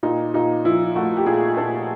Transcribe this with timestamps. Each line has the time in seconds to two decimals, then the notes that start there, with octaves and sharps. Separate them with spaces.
0.03 A#2 D#4
0.34 A#2 D#4
0.65 F3 E4
0.96 A3 F#4
1.17 G4
1.26 A#2 G#4
1.57 A#2 A4